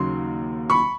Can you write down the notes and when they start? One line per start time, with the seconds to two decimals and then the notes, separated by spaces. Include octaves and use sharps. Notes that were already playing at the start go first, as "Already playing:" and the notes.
Already playing: D#2 C#3 F#3 C6
0.70 B5 C#6